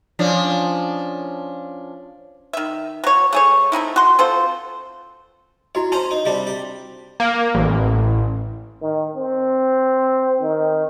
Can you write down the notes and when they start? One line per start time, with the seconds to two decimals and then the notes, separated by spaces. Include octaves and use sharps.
0.19 F3 C#4 D4
2.53 D#3 E5
3.04 F#3 C#5
3.33 A3 G#4 C#5
3.72 A3 C4 D#4 E4
3.96 F#4 C6
4.19 C4 F4 A4 C5
5.75 E4 F#4 C#5 D#5
5.92 C#4 C5 A5 A#5 C6
6.11 D#4
6.25 C3 G3 D4
6.47 G4
7.20 A#3
7.55 A1
8.82 D#3
9.16 C4
10.41 D#3